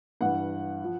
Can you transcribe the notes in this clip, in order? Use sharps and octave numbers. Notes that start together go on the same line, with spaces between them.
G2 E3 F#5
F3